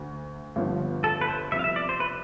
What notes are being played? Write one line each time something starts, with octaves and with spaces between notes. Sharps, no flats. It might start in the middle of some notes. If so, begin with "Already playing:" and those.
Already playing: D2 D3 A3
G1 G2 D3 F3 B3
A4
B4
C5
C2 C3 F3 B3 E5
F5
E5
D5
C5
B4